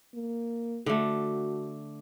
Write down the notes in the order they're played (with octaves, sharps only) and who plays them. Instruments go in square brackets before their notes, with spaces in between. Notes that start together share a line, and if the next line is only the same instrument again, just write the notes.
[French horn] A#3
[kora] D3 A3 [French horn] F#4